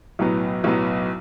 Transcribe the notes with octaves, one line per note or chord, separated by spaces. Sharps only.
B1 A2 F#3 B3
B1 A2 F#3 B3